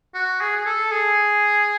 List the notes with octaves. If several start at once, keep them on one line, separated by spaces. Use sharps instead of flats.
F#4
G#4
G#4
A4
G#4